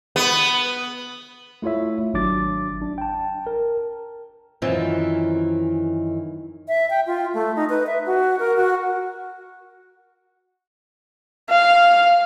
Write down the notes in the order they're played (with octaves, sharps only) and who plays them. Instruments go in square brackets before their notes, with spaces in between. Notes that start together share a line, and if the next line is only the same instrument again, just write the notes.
[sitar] B3
[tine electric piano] A3 E4 F4 C#5 E5
G#1 F#3 D4 D6 A6
D4
G5 A5
A#4
[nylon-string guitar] F#2 D#3 E3 C4 F4
[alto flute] E5
G5
F4
A3
D#4
B4
E5
F#4
A#4
F#4
[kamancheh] F5